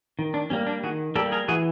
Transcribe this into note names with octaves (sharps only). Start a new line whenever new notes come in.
D#3
D4
G3 A#3 C#4
D4
D#3 F#4 G#4
G3 A#3 G4 A4
G#4 A#4
E3 F#4 G#4